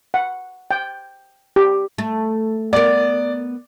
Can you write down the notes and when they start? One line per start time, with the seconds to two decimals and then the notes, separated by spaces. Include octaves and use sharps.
0.14 F#5
0.71 G5
1.56 G4
1.98 A3
2.73 B3 A#4 D5